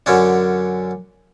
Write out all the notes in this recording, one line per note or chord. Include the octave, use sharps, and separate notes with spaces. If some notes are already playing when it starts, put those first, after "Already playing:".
F#2 D3 C#4 D4